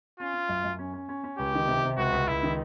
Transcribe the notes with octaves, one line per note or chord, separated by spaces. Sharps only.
C#4 F4
C#4
F#2
F#2
C#4
C#4
C#4
C#4
C#2 G4
D#3
C3
C3
C#2 F#4
C#2
C#2 E4
D#3